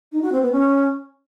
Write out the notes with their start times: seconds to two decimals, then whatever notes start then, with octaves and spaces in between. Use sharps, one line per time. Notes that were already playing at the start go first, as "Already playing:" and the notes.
0.12 D#4
0.22 F#4
0.32 C4
0.42 B3
0.52 C#4